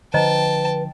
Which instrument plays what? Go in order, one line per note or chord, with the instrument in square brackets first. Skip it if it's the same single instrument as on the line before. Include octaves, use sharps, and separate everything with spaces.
[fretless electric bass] D3 F3 [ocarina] B4 [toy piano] C5 D#5 A#5 [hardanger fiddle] G5 A5